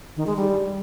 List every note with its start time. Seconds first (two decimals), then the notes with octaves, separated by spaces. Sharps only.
0.16 D#3
0.27 G#3
0.37 G3